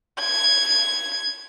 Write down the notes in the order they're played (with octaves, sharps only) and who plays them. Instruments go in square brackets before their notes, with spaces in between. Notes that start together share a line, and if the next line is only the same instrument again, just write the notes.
[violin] G#6